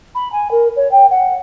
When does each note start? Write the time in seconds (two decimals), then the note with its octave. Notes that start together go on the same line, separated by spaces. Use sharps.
0.15 B5
0.32 G#5
0.51 A#4
0.76 C#5
0.91 G5
1.10 F#5